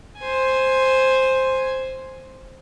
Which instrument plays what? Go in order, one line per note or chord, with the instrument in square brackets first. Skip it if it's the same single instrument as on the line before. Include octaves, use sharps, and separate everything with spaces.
[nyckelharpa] C5 G#5